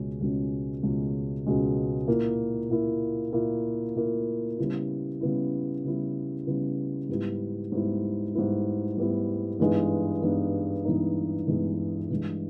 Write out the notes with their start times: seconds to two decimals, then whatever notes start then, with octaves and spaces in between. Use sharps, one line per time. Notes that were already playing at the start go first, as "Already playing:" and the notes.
Already playing: C#2 B2 G#3 C#4
0.20 C#2 B2 G#3 C#4
0.83 C#2 B2 G#3 C#4
1.46 C#2 B2 G#3 C#4
2.08 A#2 A#3 E4
2.70 A#2 A#3 E4
3.33 A#2 A#3 E4
3.95 A#2 A#3 E4
4.58 C#3 G3 B3 E4
5.21 C#3 G3 B3 E4
5.84 C#3 G3 B3 E4
6.47 C#3 G3 B3 E4
7.09 G#2 G3 B3 E4
7.72 G#2 G3 B3 E4
8.35 G#2 G3 B3 E4
8.98 G#2 G3 B3 E4
9.60 G2 E3 G#3 B3 D#4
10.23 G2 E3 G#3 B3 D#4
10.85 G2 E3 G#3 B3 D#4
11.48 G2 E3 G#3 B3 D#4
12.11 G2 E3 G#3